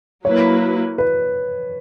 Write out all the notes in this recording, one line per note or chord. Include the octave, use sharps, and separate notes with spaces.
F#3 A#3 E4 B4 C#5
B4